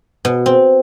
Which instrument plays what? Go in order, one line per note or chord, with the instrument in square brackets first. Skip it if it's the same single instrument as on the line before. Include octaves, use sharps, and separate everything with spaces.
[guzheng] B2
C4